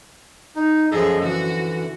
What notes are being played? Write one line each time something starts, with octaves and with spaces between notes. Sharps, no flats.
D#4
F#2 F3 G#4 A4 D#5
D3 E3 F#4